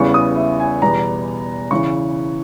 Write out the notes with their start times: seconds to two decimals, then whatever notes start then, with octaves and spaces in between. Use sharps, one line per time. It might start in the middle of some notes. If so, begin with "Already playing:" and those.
Already playing: E2 C#3 E3 G3 B3 C#6
0.14 D#6
0.36 E5
0.60 G#5
0.82 E2 B2 G3 B3 A#5
1.71 C#3 E3 C#6